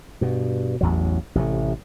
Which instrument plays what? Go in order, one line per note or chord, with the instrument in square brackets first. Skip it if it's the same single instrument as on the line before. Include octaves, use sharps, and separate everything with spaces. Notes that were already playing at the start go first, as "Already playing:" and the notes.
[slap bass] G2 B2
A1 E2 F#3
A1 C3 G3 A3